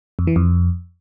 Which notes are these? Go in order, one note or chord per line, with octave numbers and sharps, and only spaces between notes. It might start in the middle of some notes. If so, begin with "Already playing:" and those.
F2
E3
F2